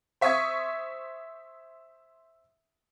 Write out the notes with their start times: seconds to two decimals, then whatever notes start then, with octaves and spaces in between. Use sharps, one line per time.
0.21 C5 E5 C#6 D#6 G#6